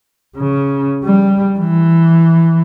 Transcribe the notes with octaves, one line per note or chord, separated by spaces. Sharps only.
C#3
G3
E3